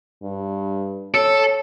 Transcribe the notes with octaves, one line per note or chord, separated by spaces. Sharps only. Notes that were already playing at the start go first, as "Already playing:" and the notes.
G2
A4 C#5